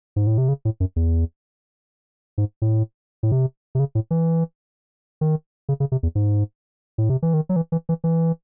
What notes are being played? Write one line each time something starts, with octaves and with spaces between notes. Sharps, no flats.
G#2
A2
C3
C#3
A2
F#2
E2
G#2
A2
A2
C3
C3
C#3
A2
E3
D#3
C#3
C#3
C3
E2
G#2
A2
C3
E3
D#3
F#3
E3
E3
E3
E3